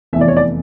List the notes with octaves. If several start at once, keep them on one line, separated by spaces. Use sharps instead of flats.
F1 E2 E3 E5
D5
C#5
D5